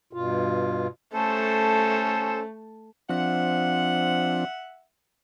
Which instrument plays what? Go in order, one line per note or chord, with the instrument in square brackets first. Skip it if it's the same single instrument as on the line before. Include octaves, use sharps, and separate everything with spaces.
[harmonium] G2 B2 F4
[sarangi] A3 [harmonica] C#4 A4 C5
[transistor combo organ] F3 C4 D4 [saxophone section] E5 F#5